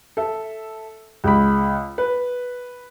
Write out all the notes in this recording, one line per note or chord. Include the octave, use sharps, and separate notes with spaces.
A4 E5
C#2 B5
B4